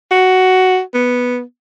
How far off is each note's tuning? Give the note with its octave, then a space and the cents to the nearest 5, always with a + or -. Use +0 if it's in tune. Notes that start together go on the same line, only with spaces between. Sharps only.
F#4 +10
B3 -5